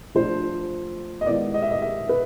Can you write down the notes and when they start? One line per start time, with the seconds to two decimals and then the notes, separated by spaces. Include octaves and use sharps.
0.15 F3 A3 D4 F4 C5
1.21 D#5
1.26 D#3 G#3 B3 E4 D5
1.54 D#5
1.62 E5
1.71 D#5
1.82 E5
2.09 B4